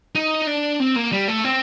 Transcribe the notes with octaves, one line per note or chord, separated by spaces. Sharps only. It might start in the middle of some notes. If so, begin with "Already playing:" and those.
D#4
D4
C4
A#3
G3
A3
C4